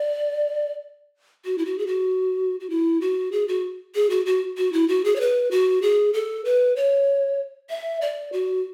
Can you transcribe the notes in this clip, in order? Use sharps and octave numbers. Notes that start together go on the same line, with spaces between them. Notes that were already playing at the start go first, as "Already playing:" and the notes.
Already playing: D5
F#4
E4
F#4
G#4
F#4
F#4
E4
F#4
G#4
F#4
G#4
F#4
F#4
F#4
E4
F#4
G#4
C#5
B4
F#4
G#4
A4
B4
C#5
E5
D5
F#4